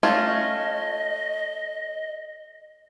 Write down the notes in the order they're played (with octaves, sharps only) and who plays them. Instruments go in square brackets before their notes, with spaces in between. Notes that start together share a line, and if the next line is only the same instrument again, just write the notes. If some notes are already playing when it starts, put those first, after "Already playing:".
[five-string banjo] A3 C#4 F4 [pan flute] D#5